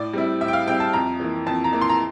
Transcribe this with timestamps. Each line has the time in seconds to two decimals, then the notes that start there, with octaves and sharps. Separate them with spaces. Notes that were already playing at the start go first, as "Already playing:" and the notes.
Already playing: A2 D5
0.13 G3 C4 E4
0.41 A2 E5
0.48 G5
0.53 F5
0.67 G3 C4 E4 G5
0.80 A5
0.93 F2 A#5
1.20 E3 A#3
1.46 F2 A5
1.64 A#5
1.73 E3 A#3
1.81 C6
1.89 A#5